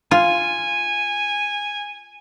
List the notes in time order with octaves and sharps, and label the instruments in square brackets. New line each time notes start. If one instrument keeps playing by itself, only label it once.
[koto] F4 [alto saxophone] G#5